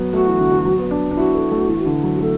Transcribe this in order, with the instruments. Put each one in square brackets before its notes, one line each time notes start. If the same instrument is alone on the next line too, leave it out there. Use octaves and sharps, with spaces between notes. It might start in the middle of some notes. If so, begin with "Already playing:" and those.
Already playing: [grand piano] F#3 B3
[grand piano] A3 [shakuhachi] F#4
[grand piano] E3
D3
E3
F#3
B3
D4
D4
[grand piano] E4 [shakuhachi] F#4
[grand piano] A4
A3
E3
D3
F#3
[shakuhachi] F#4
[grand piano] A3 [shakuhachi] A4